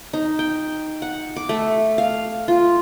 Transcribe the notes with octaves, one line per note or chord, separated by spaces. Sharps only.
D#4
G5
F#5
D6
A3
F5
F4